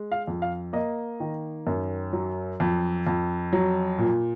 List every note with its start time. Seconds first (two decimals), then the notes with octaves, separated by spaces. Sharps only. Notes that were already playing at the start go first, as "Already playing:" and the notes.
Already playing: G#3
0.12 F5
0.27 F2
0.42 F5
0.73 A#3 D#5
1.20 D#3
1.67 F#2
2.13 F#3
2.60 F2
3.07 F2
3.53 F#3
3.98 A#2